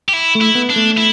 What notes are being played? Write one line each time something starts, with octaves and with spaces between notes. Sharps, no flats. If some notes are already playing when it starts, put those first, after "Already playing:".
G4
E4
A3
E4
B3
D4
A3
E4